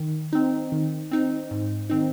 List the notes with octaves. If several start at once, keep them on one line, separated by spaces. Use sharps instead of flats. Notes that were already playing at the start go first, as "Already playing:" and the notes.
Already playing: D#3
C4 D#4
D#3
C4 D#4
G#2
D#3 C4 D#4